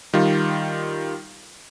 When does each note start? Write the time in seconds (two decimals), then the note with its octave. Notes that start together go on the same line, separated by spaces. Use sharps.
0.13 D#3 G3 F4